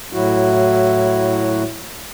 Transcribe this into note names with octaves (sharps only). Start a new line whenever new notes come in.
A2 F#3 E4 F#4